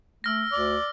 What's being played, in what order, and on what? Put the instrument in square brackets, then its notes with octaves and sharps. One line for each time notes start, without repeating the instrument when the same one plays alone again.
[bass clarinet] A3 [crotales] E6 F6 A#6
[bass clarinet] D2 [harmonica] D5